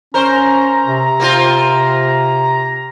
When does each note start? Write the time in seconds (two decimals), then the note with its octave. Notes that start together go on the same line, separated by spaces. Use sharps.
0.14 C#4 A#4 C5 A#5
0.85 C3
1.20 A#3 C4 F4